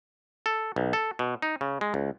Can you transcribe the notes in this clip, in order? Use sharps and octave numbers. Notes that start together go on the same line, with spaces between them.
A4
B1
A4
B2
D#4
C#3
G#3
C#2